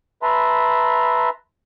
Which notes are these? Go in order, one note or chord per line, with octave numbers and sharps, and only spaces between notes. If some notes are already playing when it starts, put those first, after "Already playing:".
B4 E5 A5 A#5 C6